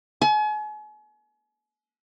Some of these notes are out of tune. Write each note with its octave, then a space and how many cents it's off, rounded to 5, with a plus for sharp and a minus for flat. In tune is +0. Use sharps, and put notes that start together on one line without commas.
G#5 +40